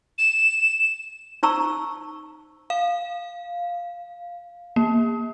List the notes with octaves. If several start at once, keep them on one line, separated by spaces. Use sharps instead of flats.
E7
D#4 C5 A#5 C#6 E6
F5
A#3